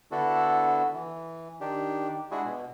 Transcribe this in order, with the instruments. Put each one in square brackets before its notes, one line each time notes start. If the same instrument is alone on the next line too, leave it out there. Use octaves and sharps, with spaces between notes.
[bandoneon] D3 B3 D4 E4 F#4 A4
E3
D#3 D4 G4
G#3 D4 E4 F#4 G#4
B2